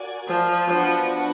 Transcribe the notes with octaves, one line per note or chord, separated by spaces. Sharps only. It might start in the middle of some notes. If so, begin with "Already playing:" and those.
Already playing: F#4 A#4 D5 G#5
F3
F3 B3 D4 F#4 B4